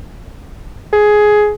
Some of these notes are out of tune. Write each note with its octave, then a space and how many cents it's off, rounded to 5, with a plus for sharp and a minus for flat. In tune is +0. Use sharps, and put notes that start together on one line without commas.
G#4 +15